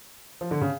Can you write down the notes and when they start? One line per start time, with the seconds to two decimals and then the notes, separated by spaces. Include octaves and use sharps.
0.41 F3
0.51 D3
0.61 C#3